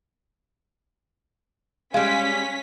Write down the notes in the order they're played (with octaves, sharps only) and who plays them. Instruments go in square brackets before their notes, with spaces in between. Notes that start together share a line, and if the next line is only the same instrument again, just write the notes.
[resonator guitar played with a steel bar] G3 G#3 [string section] C#4 B6 [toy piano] F5